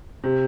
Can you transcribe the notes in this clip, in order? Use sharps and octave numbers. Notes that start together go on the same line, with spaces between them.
C3